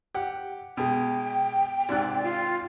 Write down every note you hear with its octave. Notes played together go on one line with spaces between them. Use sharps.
G4 F#5
B2 G#3 G5
G#2 C3 D5 F#6
F4